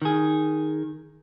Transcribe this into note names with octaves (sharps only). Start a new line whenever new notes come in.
D#3 G#4